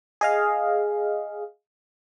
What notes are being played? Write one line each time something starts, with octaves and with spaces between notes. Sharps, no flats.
G#4 D#5 F5